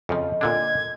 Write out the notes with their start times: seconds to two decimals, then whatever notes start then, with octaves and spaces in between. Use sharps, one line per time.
0.09 F2 C#3 F3 D#5
0.41 A#2 D3 D4 G#6